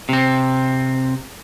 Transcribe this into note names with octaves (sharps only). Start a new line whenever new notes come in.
C3 C4